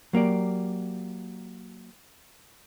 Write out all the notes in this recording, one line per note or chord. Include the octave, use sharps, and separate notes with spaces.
F#3 A#3 G4 D5